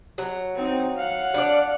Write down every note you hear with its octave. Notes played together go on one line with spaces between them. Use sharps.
F#3
C4 D#4
F5 F#5
D4 D5